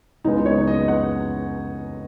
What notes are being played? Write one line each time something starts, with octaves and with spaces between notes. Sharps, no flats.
C#2 C#3 G#3 B3 D#4
C#5
D#5
F#5